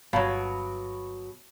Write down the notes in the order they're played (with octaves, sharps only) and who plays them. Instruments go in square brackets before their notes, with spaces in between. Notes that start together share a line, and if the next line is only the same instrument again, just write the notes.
[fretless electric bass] G1 [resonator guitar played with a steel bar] B2 F#3 [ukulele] F5 A5 B5